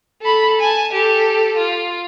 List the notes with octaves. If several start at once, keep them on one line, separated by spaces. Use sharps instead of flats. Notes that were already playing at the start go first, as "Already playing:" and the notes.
A4 B5
G#5 A5
G4 A4
F4